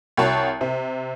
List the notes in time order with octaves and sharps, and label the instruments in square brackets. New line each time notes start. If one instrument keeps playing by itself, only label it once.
[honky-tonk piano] C2 F#4 C#5 A5
C3